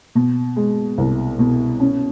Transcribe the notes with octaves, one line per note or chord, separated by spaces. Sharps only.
B2
G#3
C2
B2
C#4